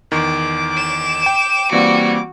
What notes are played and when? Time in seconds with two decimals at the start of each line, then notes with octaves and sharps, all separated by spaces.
0.12 E2 D#3 D6
0.78 E7
1.26 G5
1.72 E3 G3 A#3 C4 F#4